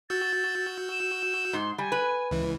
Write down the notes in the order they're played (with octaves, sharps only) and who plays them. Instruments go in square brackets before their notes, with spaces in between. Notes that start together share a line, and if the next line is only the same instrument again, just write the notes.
[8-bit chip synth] F#4 E6 G6 [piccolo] A6
[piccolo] E7
[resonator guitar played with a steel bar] G#2 [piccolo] C6
[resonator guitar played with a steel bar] G3 [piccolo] G#5
[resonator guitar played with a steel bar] B4
[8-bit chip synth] C#2 E3